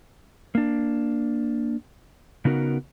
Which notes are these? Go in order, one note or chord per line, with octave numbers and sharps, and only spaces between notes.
A#3 D4
C#3 B3 D#4 F#4 A#4